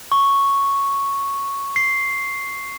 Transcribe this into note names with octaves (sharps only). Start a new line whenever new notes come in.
C#6
C7